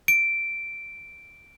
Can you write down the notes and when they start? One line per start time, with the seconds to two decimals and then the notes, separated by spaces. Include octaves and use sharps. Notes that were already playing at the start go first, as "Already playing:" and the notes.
0.08 D7